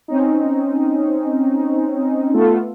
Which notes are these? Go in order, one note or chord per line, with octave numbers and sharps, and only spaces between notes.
C4 C#4 D#4
A3 B3 F4 A4